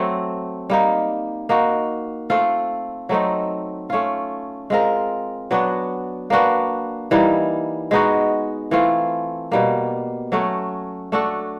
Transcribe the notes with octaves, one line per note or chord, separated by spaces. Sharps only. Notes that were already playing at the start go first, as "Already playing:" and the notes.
Already playing: F#3 A3 C4
G3 A#3 D#4
A#3 D#4 F#4
A3 C4 F4
F#3 A3 C4 D#4
A3 C#4 F4
G#3 C4 F4 A#4
F#3 B3 D4 F#4
A#3 D4 F#4 B4
E3 G3 A#3 D#4
G#3 B3 D#4 F#4
E3 A3 C4 F4
B2 G3 A#3
F#3 A3 C#4 F#4
A3 D4 F#4 A4